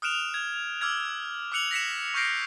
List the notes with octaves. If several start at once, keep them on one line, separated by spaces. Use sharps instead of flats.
D#6 F6 F#6 D7 E7 F7
G#6
D6 E6 F6 G#6
D6 E6 F#6 C#7 F7 F#7
A#6 B6 C#7 E7
C#6 F6 G6 A#6 C7 D7